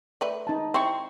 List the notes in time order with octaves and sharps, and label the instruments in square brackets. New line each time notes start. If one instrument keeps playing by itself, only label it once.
[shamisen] A3 B4 D5
[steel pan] D#4 A5
[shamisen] C4 E4 [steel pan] C6 C#6